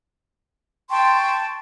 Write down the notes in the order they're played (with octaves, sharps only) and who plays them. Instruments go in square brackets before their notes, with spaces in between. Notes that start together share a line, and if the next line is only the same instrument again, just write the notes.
[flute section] G5 A5 C6 C#6